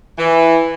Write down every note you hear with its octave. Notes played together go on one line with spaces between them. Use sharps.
E3